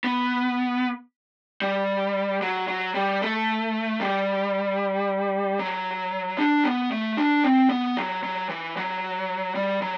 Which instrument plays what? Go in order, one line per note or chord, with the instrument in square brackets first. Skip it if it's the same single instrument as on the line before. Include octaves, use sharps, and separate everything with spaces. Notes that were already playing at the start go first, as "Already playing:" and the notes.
[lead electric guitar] B3
G3
F#3
F#3
G3
A3
G3
F#3
D4
B3
A3
D4
C4
B3
F#3
F#3
E3
F#3
G3
F#3